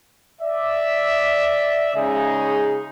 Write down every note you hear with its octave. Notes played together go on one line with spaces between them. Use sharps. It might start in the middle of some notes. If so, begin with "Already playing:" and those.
D5 E5
C#3 G#3 D#4 G#4